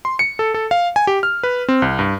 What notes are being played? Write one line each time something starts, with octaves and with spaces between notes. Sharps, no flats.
C6
C#7
A4
A4
F5
G#5
G4
F6
B4
C4
C2
G2